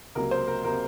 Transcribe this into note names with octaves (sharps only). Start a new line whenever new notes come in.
C#2 C3 F#3 A#3 A#4
C5
A#4
C3 F#3 A#3 A#4